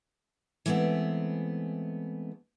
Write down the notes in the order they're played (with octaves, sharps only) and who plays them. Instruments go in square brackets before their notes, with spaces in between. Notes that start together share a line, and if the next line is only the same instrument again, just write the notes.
[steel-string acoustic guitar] E3 G#3 A3 B3 C4